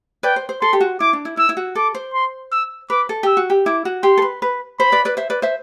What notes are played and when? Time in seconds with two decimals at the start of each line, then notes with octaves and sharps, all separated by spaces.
0.23 B4 D5 G5
0.36 C5
0.49 C5
0.61 A4 C6
0.73 G4
0.81 F#4
1.00 E4 D6
1.13 D4
1.25 E4
1.37 E4 E6
1.49 E4
1.57 F#4
1.75 A4 D6
1.95 C5
2.14 C6
2.52 E6
2.90 B4 D6
3.09 A4
3.23 G4 E6
3.37 F#4
3.50 G4
3.66 E4 D6
3.85 F#4
4.03 G4 C6
4.18 A4
4.22 B4
4.42 B4
4.79 C5 B5
4.92 B4 D5
5.05 B4 D5
5.17 C5 E5
5.30 B4 D5
5.42 C5 E5